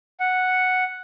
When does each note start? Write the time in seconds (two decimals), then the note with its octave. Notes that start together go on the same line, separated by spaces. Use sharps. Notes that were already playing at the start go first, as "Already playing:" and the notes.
0.20 F#5